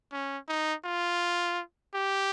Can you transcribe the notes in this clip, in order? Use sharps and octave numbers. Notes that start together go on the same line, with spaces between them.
C#4
D#4
F4
G4